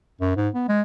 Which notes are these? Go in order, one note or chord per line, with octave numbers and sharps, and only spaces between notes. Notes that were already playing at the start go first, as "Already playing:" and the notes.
F#2
G#2
B3
G#3